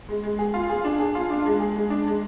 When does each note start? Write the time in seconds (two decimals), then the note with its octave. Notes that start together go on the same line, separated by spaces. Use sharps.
0.09 G#3
0.23 G#3
0.39 G#4
0.54 F4
0.69 G#4
0.85 D4
0.99 G#4
1.15 F4
1.30 D4
1.45 G#3
1.60 G#4
1.76 G#3
1.90 D4
2.07 G#3